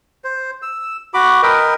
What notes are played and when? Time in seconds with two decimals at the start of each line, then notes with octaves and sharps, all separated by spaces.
0.24 C5
0.62 E6
1.14 F#4 B5 D6
1.43 A#4 B4 D#5 G5